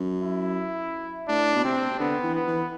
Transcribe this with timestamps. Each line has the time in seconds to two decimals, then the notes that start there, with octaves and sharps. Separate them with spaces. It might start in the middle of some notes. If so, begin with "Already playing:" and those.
Already playing: F#2
0.21 E4
1.28 A2 D4
1.55 B2
1.64 C3 C4
2.00 D3 B3
2.23 E3
2.35 B3
2.47 E3